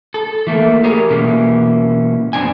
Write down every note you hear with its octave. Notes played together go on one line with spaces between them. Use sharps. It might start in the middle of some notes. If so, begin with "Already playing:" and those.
A4
E3 A3 A#3
G4 G#4 A#4 C#5
B2 E3 A#3 C#4
F#2 B3 C4 D4 G#5